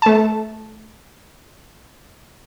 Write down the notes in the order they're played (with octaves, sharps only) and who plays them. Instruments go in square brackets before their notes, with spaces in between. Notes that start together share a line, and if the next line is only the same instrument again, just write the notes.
[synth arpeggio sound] A3 A5